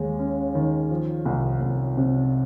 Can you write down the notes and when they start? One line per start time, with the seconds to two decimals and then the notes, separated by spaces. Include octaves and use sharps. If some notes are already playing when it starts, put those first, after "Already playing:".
Already playing: D#2 G#3
0.19 C#4
0.55 D#3
0.91 F3
1.25 C2
1.61 C2
1.97 C3